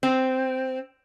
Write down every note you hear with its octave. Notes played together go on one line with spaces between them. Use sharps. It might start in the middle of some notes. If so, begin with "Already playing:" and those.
C4